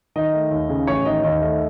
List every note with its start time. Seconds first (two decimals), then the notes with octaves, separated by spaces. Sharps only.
0.16 D#3 D#5
0.33 A3
0.51 D#2
0.69 C#3
0.87 A1 C#5
1.05 D#3 D#5
1.23 D#2 D#5
1.42 A3